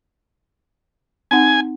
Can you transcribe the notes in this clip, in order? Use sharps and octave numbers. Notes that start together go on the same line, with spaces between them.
C4 D#4 F#5 G#5